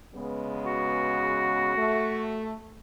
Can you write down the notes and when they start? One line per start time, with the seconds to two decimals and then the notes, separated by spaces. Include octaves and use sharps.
0.15 C#3 G#3 B3
0.66 F#4
1.77 A3